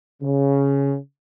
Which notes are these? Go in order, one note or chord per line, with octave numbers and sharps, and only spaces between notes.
C#3